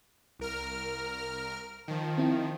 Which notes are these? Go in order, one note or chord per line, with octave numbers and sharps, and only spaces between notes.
C2 A#4 F6
D#3 F3
C4 E4